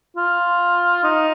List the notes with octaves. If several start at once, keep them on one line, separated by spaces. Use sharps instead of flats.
F4
D#4